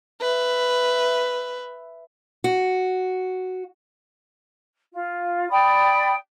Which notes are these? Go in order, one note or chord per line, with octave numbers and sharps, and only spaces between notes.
B4 E5
F#4
F4
D5 G5 B5 D#6